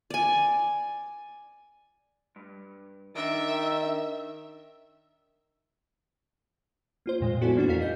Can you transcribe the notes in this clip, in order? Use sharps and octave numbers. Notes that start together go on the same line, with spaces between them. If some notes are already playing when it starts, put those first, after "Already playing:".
D5 G#5
G2
D#3 D4 A#4 D5 E5
A#3 F4 C5
F2 A#2 G#3
B3 E4 F#4 A4 D5 G#5
E3 A#3 D4 F#4
F2 A#4 F5 B6
G#4 D#5 G6